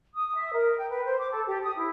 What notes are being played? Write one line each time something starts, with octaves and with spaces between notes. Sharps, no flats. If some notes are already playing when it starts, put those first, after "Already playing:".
D#6
E5
A#4
G5
B4
C5
D6
A4
G4
D#6
E4